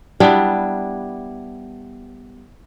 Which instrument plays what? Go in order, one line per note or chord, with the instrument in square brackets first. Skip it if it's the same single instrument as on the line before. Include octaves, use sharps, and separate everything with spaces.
[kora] G3 B3 D4 E4